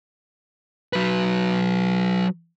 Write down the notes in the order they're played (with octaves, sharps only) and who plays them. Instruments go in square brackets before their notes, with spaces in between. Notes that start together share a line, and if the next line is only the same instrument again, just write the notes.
[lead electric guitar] F#3 B4